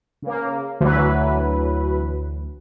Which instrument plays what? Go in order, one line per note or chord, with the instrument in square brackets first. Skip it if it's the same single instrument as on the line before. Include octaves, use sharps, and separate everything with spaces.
[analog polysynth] C#3 A#3
[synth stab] D2 [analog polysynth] E3 F#3 B4